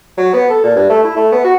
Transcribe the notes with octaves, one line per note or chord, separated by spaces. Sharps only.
F#3
B3
A4
A#2
G2
A3
E4
A3
B3
F#4